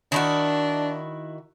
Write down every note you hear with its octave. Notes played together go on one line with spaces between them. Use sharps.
D#3 D4 E4 F#4